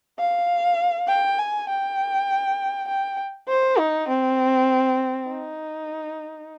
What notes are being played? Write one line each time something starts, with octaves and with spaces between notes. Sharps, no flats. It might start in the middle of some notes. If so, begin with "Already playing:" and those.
F5
G5
G#5
G5
G5
C5
D#4
C4
D#4